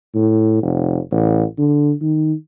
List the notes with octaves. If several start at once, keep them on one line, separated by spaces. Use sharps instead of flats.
A2
F1
A1
D3
D#3